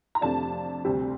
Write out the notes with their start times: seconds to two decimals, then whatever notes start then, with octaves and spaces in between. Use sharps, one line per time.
0.15 A#5
0.21 F2 C3 F3 A3 D4 A5
0.85 D2 C3 G3 C4